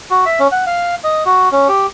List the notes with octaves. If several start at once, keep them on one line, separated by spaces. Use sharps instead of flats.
F#4
E5
C#4
F#5
F5
D#5
F#4
C#4
G4